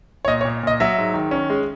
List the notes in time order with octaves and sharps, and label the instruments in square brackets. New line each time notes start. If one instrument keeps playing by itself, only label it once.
[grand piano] C#5
A#2 D#5
C#5
A#2
A#2 D#5
F#3 E5
G#2
D#3
C#4
G#3